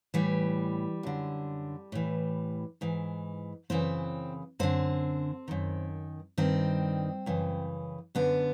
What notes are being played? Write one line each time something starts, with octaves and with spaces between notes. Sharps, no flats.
A2 E3 G3
F#2 D3
A2 E3
G#2 E3
F#2 C#3 E3 C4
F#2 D3 C4
F#2 D#3
G2 D#3 C4
F#2 C#3 E3
F#2 D3 B3